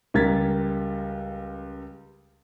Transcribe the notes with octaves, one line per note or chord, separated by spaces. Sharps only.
C#2 G3 A#4 G#6 A6 B6